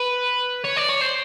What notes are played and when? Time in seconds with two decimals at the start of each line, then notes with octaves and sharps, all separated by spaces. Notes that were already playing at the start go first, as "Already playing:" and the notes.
Already playing: B4
0.65 C#5
0.77 D5
0.89 C#5
1.01 C5